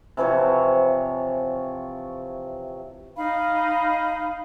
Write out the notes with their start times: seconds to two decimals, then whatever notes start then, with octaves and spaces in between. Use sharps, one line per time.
0.17 C3 E3 F3 C#5
3.16 D#4 F5 B5